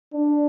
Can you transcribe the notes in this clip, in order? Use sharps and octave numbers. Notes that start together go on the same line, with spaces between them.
D4